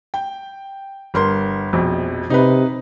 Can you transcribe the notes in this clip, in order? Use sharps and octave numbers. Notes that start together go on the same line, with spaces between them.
G5
G1 A#4 C6
A#1 F2 B2
C3 D#4 B4